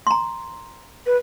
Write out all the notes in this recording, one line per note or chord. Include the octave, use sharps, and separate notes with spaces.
A#5 C6
B4